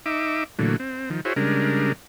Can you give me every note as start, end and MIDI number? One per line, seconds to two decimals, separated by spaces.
0.06 0.44 63
0.06 0.44 76
0.06 0.44 86
0.59 0.76 46
0.59 0.76 50
0.59 0.76 52
0.59 0.76 54
0.59 0.76 57
0.80 1.10 60
1.10 1.21 51
1.10 1.21 53
1.25 1.33 64
1.25 1.33 66
1.25 1.33 68
1.25 1.33 72
1.25 1.33 73
1.36 1.92 49
1.36 1.92 55
1.36 1.92 56
1.36 1.92 62
1.36 1.92 70